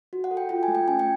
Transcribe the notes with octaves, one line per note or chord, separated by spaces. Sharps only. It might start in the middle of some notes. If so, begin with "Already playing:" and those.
F#4
F#5
A4
G5
F4 G5
G#5
A3
G5
C#4 G#5
G5